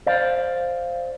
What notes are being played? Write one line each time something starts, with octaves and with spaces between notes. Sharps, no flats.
C5 D5 F5